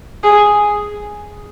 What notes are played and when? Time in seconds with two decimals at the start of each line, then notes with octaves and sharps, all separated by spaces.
0.24 G#4